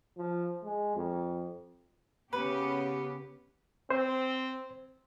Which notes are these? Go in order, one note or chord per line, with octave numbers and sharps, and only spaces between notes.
F3
G#3
F2
C#3 B3 G4 B4
C4 C5